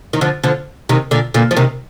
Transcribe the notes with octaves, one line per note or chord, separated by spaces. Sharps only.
D#3
D3 F3
D3 F3
C3 D#3
A#2 D3
A#2 D3
F3
C3 D#3